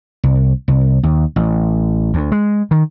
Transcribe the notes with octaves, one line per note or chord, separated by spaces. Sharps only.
C2
C2
D#2
A1
D2
G#3
D#3